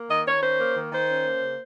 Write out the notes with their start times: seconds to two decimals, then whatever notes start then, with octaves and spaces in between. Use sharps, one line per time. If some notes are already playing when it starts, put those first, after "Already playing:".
Already playing: A#3
0.09 D#3 D#5
0.26 D#3 C#5
0.42 C#4 C5
0.59 A#3
0.76 D#3
0.92 D#3 C5
1.08 C#4
1.25 A#3
1.42 C#3